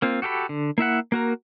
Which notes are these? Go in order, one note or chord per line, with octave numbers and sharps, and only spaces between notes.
A#3 C4 F4
F#4 G4 A4 B4 B5
D3
A#3 E4 E5 F#5
A#3 F#4 A#4